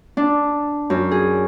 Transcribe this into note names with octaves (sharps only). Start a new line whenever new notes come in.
D4
F#2
G#4